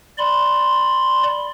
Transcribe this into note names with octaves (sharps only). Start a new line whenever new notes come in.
D5 B5 C6